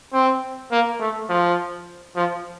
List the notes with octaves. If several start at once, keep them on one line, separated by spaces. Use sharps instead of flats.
C4
A#3
A3
F3
F3